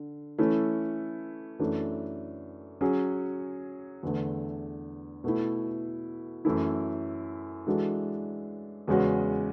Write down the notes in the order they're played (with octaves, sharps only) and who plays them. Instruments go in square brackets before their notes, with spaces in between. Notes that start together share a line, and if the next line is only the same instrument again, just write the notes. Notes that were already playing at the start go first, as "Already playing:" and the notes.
Already playing: [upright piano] D3
E3 A3 C#4 E4
F#2 E3 A3 D4
F#3 C#4 G#4
E2 D3 A3
B2 A3 E4
F#2 E3 A3 E4
E3 G#3 D4 F#4 A4
E2 C#3 G#3 C#4 F#4